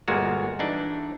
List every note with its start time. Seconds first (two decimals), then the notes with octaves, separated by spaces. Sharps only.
0.08 G1 A#2 G#3 F#4 F5
0.59 E3 D4 D#4